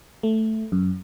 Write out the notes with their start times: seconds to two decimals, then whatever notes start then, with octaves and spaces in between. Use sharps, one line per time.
0.23 A3
0.72 F#2